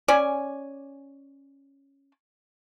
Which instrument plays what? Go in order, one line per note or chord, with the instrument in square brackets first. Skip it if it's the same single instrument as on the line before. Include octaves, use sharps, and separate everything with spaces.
[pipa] C#4 D5 G#5